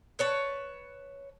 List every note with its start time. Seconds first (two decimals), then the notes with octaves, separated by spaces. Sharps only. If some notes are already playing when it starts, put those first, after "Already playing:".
0.19 B4 C#5 A5